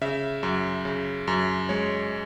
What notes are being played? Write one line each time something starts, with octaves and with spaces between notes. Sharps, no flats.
C#3 E5
F#2
C#3
F#2
G#3 C#5